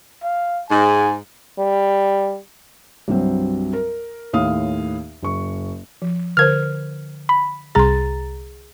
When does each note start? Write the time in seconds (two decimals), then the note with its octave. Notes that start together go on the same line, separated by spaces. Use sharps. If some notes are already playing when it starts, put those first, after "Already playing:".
0.23 F5
0.70 G#2 G#5
1.59 G3
3.08 C2 G2 F#3 C4
3.73 A#4
4.33 D#2 A2 F5 D#6
5.22 F#1 C#6
6.02 F3
6.37 D3 A#4 C5 F6 G#6
7.29 B5
7.75 C2 G#4 A#5 C6 A6